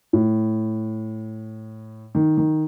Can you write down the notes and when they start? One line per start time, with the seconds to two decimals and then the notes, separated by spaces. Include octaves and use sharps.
0.13 A2
2.15 D#3
2.37 D#3